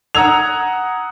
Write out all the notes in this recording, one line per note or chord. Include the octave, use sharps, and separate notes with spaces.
F#5 A#5 D#6 E6 G#6 F7